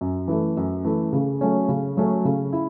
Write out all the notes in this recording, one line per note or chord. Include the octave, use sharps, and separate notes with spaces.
F#2
E3 A3
F#2
E3 A3
C#3
F#3 A3 C#4
C#3
F#3 A3 C#4
C#3
E4